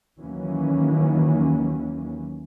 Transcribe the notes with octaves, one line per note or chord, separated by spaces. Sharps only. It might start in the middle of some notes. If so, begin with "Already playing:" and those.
D#2 D#3 E3 F#3 A#3 C#4